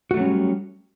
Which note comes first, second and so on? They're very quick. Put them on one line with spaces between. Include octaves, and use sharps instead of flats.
F#4 A3 F#3 C#4 G3